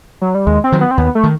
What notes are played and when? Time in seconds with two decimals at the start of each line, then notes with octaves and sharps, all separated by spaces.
0.22 F#3
0.35 G3
0.47 D#2 G#3
0.64 C4
0.72 D#3 F#3
0.81 B3
0.91 C4
0.98 D#2 B3
1.15 A3
1.24 D#3